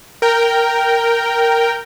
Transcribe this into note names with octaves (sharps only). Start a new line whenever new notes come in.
A#4 G5